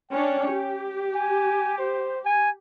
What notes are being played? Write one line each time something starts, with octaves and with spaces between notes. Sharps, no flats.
C#4 D4 C#5 G5
G4
G#5
C5
G#5